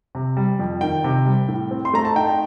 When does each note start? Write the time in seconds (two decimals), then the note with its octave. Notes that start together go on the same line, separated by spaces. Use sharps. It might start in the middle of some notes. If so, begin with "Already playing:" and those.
0.15 C3
0.37 G3
0.59 F2
0.81 D#3 G5
1.04 C3
1.26 G3
1.48 A2
1.71 C4
1.85 C6
1.94 A3 A#5
2.05 A5
2.15 D#4 G5